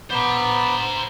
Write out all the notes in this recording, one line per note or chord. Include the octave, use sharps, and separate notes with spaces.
B3 C5 A#5 B5 D6